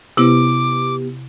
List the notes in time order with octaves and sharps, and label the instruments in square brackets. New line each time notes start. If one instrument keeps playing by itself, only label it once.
[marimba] C3 E4 [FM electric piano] B3 G4 [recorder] D6